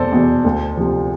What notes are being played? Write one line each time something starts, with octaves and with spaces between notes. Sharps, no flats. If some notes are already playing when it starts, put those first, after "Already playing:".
Already playing: F1 E2 B2 A4 C5 D5
E2 B2
D2
C3 F3